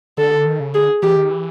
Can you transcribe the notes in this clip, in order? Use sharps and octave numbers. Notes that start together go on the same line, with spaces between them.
D3 A4
D#3
C#3
D3 G#4
E3 G4
D#3
E3